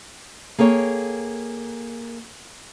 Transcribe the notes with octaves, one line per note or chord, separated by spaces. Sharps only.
A#3 G#4 A4 C#5 G5